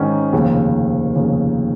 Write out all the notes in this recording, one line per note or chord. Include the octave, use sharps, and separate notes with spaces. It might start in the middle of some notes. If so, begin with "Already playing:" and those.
Already playing: G#2 D#3 C#4
F1 D#2 C#3
F1 D#2 C#3